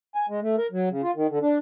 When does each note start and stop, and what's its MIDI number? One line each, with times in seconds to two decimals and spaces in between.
0.15 0.26 80
0.29 0.40 56
0.42 0.56 57
0.58 0.67 70
0.72 0.89 54
0.90 1.02 49
1.03 1.11 65
1.15 1.27 51
1.30 1.39 50
1.41 1.58 62